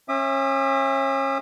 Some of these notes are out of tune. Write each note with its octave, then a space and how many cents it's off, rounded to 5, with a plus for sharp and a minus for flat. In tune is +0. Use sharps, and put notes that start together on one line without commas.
C#4 -35 E5 +0 D#6 -45